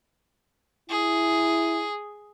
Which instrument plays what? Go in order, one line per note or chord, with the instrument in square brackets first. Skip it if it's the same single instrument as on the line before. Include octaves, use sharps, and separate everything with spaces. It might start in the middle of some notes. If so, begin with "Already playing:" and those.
[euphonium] E4 [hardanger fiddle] G#4